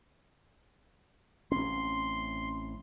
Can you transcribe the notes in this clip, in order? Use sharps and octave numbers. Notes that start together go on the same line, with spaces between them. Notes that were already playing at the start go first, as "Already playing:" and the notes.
A1 C4 C#4 C6